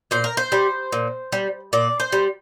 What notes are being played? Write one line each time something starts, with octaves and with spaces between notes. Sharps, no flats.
A#2 C5
A#4
C5
G3
A#2
G3
A#2 D5
C5
G3